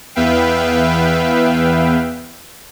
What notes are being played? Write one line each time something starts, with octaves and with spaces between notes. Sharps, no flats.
E2 B3 B4 E5 F5 G5